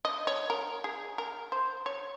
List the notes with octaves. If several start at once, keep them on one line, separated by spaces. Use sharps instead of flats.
D#5
C#5
A#4
G#4
A#4
C5
C#5